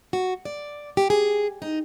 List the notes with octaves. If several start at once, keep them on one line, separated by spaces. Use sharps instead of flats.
F#4
D5
G4
G#4
D#4